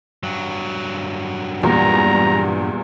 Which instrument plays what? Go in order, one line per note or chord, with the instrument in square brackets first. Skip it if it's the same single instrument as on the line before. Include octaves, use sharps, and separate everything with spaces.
[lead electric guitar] G2 F#3
[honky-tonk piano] E2 A#2 [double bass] G3 [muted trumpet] A#5